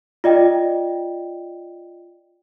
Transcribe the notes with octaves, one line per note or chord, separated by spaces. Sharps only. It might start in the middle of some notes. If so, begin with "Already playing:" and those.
F4 D5 D#5 G5